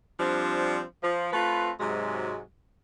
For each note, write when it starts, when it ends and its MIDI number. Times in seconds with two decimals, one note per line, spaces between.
0.20 0.82 53
0.20 0.82 55
0.20 0.82 60
0.20 0.82 62
1.03 1.29 53
1.33 1.71 57
1.33 1.71 60
1.33 1.71 65
1.33 1.71 71
1.79 2.42 44
1.79 2.42 48
1.79 2.42 54
1.79 2.42 56
1.79 2.42 66